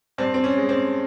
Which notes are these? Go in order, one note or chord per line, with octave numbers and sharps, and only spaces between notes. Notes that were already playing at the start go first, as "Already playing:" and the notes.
G2 C4
C4
C#4
G#3
C4